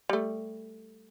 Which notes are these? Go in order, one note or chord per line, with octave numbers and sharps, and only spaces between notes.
G3 A3